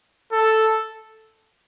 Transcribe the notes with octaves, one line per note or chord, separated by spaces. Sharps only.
A4